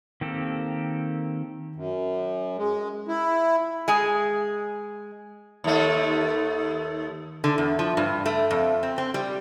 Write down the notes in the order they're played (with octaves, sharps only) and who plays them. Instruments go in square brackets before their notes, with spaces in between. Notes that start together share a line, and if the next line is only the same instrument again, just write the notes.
[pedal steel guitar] D#3 A#3 C4 G4 A4
[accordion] F#2
G#3
E4
[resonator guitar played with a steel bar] G#3 G#4
[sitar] D#2 A3
[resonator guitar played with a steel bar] D3
E2
F3
G2
A3
F2
C4
C4
G3